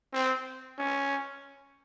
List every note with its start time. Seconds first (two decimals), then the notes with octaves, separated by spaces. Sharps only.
0.13 C4
0.79 C#4